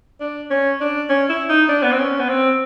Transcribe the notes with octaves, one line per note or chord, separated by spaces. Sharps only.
D4
C#4
D4
C#4
E4
D#4
D4
B3
C4
C#4
B3
C4